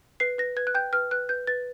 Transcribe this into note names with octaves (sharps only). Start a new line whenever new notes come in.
B4 C7
B4 A#6
B4 G#6
F#6
G5 G6
B4 F6
B4 F#6
B4 G6
B4 A6